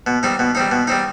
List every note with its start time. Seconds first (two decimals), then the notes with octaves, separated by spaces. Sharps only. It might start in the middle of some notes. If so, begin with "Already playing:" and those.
0.07 B2
0.23 G3 C4 D#4
0.39 B2
0.55 G3 C4 D#4
0.71 B2
0.87 G3 C4 D#4